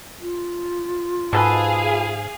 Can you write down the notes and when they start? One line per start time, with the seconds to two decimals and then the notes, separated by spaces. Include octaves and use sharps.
0.20 F4
1.33 G#2 B2 G#4 A4 B4 F5